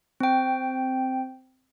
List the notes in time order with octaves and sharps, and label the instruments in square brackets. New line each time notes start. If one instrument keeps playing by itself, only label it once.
[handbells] C4 G5